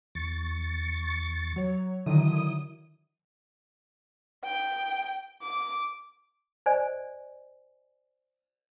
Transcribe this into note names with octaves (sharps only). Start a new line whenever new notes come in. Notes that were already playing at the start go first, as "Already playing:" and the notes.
E2 C#6 A6
F#3 C#5
D3 D#3 F#3 E4 D#6
G5
D6
C5 D5 D#5 G#5